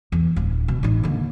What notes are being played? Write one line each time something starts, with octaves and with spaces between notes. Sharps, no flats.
E2
D1
B2
A1 D#4
D#2 D3